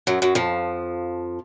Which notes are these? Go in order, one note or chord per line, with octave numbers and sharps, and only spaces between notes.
F#2 F#3
F#2 F#3
F2 F3